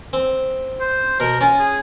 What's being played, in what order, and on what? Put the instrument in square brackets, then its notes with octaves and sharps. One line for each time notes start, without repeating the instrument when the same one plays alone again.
[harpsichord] C4
[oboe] C5
[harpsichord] B2 [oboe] A#4
[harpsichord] C#4 [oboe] F4
[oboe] G#4